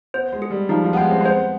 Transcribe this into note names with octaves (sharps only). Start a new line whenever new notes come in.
B3 C5
G#3
G#4
G3
F3 D#4
F3
B3
G#3 G5
C4
G#3
B3 C5